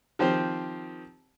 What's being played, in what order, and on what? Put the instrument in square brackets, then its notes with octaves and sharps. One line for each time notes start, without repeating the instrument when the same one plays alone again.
[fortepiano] D#3 F3 C4 G4 C5